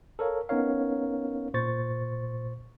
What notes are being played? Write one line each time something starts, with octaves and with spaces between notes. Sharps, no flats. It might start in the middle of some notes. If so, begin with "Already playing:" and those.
A4 A#4 C#5 F5
B3 C#4 D#4 A#4 C#5 F5
A#2 C5 C#6 A6